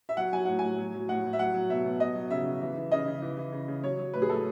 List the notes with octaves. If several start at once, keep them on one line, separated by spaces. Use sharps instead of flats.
E5
F#3 F#5
F#3 G#5
A2 F#5
A2 G#5
F#3
F#3
A2 F#5
A2
E5
F#3 F#5
F#3
B2 E5
B2
F#3 D#5
F#3
C#3 E5
C#3
E3
E3
C#3 D#5
C#3
E3
E3
C#3
C#3
F#3 C#5
F#3
A2 B4
G#4
A2 A4